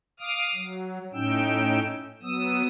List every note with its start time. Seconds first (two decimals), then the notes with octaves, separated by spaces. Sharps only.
0.20 F5 D6 D#6 F6
0.55 F#3
1.13 A2 C#4 D#4 G5 E6
2.22 F#3 B3 D#6 E6